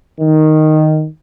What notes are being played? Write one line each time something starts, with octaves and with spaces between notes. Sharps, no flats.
D#3